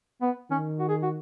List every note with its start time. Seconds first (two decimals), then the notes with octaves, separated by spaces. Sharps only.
0.22 B3
0.50 D#3 C#4
0.80 F#4
0.89 G#4
1.03 F#4